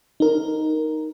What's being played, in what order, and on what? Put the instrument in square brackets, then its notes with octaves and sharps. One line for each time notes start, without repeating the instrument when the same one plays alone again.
[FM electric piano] D#4 A#4